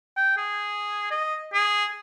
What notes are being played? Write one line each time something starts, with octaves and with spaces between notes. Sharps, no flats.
G5
G#4
D#5
G#4